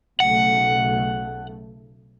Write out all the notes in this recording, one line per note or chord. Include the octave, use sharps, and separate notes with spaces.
B1 C#3 A3 F#5